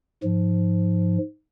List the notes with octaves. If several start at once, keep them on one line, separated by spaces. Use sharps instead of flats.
G#2 F3